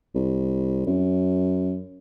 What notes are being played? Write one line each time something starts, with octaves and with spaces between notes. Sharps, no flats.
C2
F#2